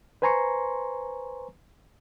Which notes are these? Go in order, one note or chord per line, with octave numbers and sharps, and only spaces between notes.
B4 C5 G#5 A#5 C6 C#6